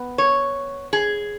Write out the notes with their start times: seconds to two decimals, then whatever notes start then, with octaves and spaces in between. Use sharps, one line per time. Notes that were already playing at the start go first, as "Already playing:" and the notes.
Already playing: B3
0.18 C#5
0.93 G#4